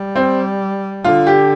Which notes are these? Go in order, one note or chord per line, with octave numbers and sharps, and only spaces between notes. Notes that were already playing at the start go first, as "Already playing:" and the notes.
Already playing: G3
C4
D3 F4
G4